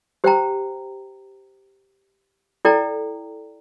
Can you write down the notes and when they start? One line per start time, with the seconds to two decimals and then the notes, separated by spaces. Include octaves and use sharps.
0.24 G4 C5 G5 A#5
2.65 E4 A4 D5 G5 A#5